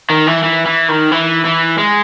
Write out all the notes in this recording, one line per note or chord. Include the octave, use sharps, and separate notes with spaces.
D#3
E3
E3
E3
D#3
E3
E3
G#3